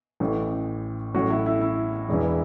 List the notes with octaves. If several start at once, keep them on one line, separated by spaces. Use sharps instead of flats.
A1 A2 E3 C#4
A1 A2 F#3 C#4 F#4
E4 A4
E4
E4
E1 E2 E3